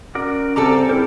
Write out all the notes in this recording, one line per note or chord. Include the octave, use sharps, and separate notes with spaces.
C#4 F#4 A#4 D5
C#3 G3 C4 A4 A#5 D6
C4 E4 G#4 A#4 C5